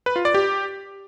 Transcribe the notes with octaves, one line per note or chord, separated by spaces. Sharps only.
B4
F4
D5
G4